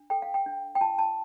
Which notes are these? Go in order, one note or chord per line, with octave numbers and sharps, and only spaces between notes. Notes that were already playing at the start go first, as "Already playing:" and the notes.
Already playing: D4
A4 G5
F5
G5
D4
G5
F4 A5
A5